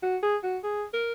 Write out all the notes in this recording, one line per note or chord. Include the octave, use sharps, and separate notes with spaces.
F#4
G#4
F#4
G#4
A#4